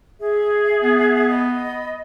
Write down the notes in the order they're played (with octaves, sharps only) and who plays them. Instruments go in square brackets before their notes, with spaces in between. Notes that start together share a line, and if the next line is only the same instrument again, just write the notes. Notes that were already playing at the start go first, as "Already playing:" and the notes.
[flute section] G#4 E5
[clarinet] B3
[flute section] D#5 B5